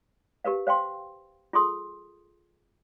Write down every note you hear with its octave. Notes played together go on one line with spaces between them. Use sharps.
G4 A#4 B4 F5
C5 F5 G5 C6
F4 G#4 A4 C6 D#6